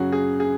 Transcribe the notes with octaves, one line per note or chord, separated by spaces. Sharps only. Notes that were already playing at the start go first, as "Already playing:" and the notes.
Already playing: F#2 C#3 F#3 F#4 G#4
G#4
G#4